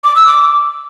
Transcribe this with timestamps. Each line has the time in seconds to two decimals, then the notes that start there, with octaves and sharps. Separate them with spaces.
0.04 D6
0.16 E6
0.27 D6